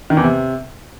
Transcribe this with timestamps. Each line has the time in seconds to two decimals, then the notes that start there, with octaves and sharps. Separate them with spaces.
0.10 D#3
0.17 E2
0.24 C3